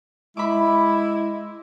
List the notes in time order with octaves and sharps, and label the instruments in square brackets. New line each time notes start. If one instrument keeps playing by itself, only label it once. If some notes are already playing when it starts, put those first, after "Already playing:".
[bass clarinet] G#3 [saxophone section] E4 [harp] B5 D6